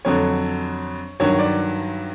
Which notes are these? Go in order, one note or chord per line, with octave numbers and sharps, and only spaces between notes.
F2 D3 F#3 C#5
G2 D#3 F#3 C#5
D5